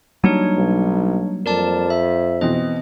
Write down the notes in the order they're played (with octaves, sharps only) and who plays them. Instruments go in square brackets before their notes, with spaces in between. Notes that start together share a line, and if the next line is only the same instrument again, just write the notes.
[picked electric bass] F#3 G3 A#3 [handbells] D4 D#4 C#5
[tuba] B1
[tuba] F2 [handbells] A#4 D5 A5
[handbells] E5
[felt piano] B2 E3 C4 [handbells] D#5